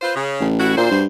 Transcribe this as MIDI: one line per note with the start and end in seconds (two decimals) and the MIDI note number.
0.02 0.11 65
0.02 0.11 71
0.02 0.11 72
0.16 0.45 49
0.40 0.75 33
0.59 0.76 64
0.59 0.76 66
0.77 1.00 38
0.77 0.88 46
0.77 1.00 72
0.91 1.06 43